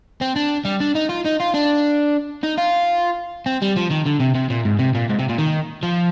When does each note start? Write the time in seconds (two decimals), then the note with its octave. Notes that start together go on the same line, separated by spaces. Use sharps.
0.21 C4
0.36 D4
0.65 G3
0.80 D4
0.95 D#4
1.09 F4
1.25 D#4
1.40 F4
1.54 D4
2.43 D#4
2.58 F4
3.46 C4
3.62 G3
3.76 F3
3.90 D#3
4.06 D3
4.20 C3
4.35 C3
4.50 A#2
4.65 G#2
4.79 C3
4.95 A#2
5.09 G#2
5.19 C3
5.29 A#2
5.38 D#3
5.83 F3